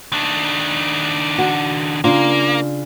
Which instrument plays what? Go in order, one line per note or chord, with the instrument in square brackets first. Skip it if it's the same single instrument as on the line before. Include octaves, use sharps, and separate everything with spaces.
[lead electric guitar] D#3 D4
[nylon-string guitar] F#4
[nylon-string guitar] C#3 D4 F4 [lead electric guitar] A#3